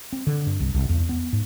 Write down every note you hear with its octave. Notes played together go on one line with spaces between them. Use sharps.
C4
D3
G2
C2
C2
E2
B3
G#2